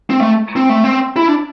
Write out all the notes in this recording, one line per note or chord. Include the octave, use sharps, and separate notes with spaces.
C4
A3
C4
A3
C4
E4
D4